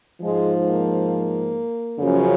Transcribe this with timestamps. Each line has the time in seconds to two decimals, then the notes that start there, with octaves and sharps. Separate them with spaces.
0.21 G#2 F3 G#3
0.66 A#3
2.00 F#2 C#3 F3